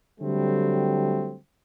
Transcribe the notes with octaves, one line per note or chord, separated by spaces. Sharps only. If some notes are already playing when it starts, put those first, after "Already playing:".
D3 F#3 G3 A3 C4